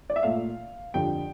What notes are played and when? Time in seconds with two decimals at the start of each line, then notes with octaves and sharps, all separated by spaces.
0.10 D5
0.16 E5
0.23 A#2 A3 F5
0.94 F2 D3 G3 G5